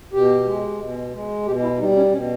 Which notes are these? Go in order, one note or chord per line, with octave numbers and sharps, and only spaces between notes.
B2 G4
G#3
B2
G#3
B2 G4
E4
G3 D#4
C#4
B2 C#4